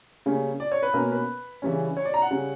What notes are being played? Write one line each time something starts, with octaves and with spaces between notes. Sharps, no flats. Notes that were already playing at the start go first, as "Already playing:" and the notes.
C#3 G3 A#3 C#4
D5
C#5
B4
B2 A#3 C#4 A#4
B4
C#3 E3 G3 C#4
C#5
D5
A#5
F#5
C#3 G3 C#4